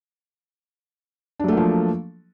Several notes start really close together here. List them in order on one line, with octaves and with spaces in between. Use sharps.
D4 F#3 A3 A#3 F3